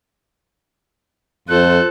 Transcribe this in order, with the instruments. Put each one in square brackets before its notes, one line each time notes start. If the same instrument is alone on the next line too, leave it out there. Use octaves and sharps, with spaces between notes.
[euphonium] F2 [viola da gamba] F4 A4 C5 [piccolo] F#6